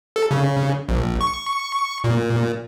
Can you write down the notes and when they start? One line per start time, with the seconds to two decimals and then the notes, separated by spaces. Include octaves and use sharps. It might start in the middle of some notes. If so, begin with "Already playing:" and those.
0.16 A4
0.31 C#3
0.89 A#1
1.21 C#6
2.04 A#2